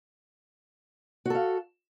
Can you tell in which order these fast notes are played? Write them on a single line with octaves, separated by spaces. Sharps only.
F#4 A4 F5